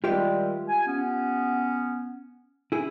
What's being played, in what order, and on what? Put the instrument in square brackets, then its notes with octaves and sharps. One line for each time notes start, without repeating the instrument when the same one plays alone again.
[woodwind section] D#3 G3 G#3 [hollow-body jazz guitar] F4 G4 E5
[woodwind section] G#5
B3 C#4
[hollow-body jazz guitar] E4 G#4